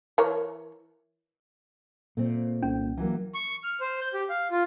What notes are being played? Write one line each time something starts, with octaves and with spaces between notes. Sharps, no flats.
E3 A#4 C#5
A#2 A3 C4
C2 C#4
E3 F#3 A#3
C#6
F6
C5
G6
G4
F5
F4